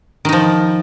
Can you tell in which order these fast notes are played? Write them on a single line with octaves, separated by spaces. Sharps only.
D#3 D#4 F3